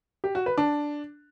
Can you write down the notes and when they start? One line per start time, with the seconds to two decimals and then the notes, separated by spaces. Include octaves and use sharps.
0.24 G4
0.35 F#4
0.46 B4
0.58 D4